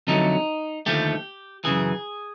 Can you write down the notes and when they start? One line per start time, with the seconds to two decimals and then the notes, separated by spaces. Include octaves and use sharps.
0.07 F2 D3 F#3 A3 D#4
0.86 D#2 D3 F3 A3 G4
1.64 F#2 C#3 E3 G#4